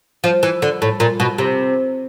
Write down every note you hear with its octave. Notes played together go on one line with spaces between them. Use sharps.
F3
E3
D3
A2
A#2
B2
C3